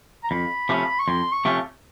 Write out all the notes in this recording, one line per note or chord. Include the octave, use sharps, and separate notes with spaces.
A#5
F2 B5
C3 F3 A3 C#4
C#6
F2 C6
C#6
C3 F3 A3 C#4